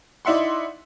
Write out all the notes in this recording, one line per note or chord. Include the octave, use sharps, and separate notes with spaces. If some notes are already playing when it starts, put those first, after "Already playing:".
D#4 E4 D5 E5 F#5 C6